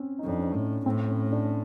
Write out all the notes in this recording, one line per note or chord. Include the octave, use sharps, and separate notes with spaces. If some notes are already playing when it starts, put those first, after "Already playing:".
Already playing: C4 C#4
D#4
F2 D4
C#4
A2
A2 C4
C#4
D4